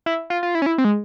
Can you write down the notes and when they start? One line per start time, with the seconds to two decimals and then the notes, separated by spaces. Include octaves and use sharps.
0.06 E4
0.30 F4
0.43 F4
0.55 E4
0.62 C#4
0.66 E4
0.78 C4
0.85 G#3